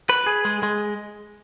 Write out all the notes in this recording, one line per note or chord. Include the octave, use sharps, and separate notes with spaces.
B4
G#4
G#3
G#3